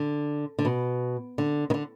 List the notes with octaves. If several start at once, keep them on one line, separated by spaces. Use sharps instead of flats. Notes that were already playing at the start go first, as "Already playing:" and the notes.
Already playing: D3
D3
B2
D3
D#3
D3